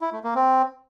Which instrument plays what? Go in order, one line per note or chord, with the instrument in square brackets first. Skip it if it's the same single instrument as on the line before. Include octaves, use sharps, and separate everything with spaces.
[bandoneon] E4
A3
A#3
C4